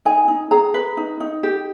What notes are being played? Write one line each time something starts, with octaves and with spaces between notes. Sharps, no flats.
D#4 G#5
D#4
G#4 A#5
B4
D#4
D#4
G4